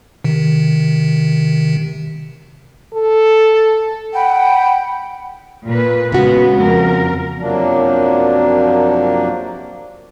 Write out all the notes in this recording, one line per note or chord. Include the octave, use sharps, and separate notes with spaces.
C3 D#3
A4
F#5 G5 B5
A#2 B4
C#3 G#3 B3 F#4
F2 A#4
F#2 C3 F3 F#3 A#3 D4